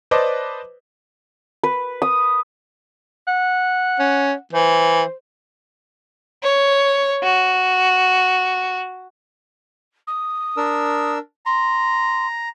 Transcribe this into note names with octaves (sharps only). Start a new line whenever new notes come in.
B4 C5 D5 D#5 A5 D6
B4
D#6
F#5
C#4
E3 C5
C#5
F#4
D#6
D4 A#4 E6
A#5 C6